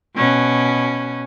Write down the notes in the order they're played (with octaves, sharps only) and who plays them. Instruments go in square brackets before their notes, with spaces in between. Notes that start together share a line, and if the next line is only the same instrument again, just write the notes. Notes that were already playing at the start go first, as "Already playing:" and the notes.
[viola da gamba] B2 C#4